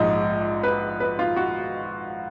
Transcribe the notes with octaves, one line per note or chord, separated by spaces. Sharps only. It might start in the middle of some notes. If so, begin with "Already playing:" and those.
Already playing: A#1 G#2 F3 D#5
B4
B4
F4
F#4